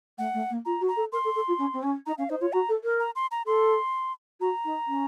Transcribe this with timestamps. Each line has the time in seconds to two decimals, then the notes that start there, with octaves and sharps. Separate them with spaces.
0.18 A3 F#5
0.34 A3
0.50 A#3
0.65 F4 A#5
0.81 F#4
0.88 A#5
0.96 A4
1.12 A#4 C6
1.24 A4
1.35 A4
1.48 F4
1.59 C#4
1.73 C4
1.83 C#4
2.06 D#4 A#5
2.18 C#4 F5
2.30 D#4 C5
2.41 F4 C#5
2.53 F#4 A#5
2.69 A4
2.84 A#4
3.00 A#5
3.16 C6
3.31 A#5
3.46 A4 C6
4.40 F#4 A#5
4.65 D#4
4.87 C#4